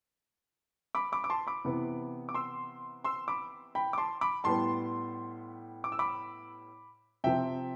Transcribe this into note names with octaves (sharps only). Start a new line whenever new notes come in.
B5 D6
B5 D6
D6
A5 C6
B5 D6
C3 E3 B3
D6
C6 E6
C6 E6
B5 D6
G5 B5
D6
A5 C6
B5 D6
A2 G3 B3 A5 C6
D6
E6
B5 D6
C3 F3 C4 E5 G5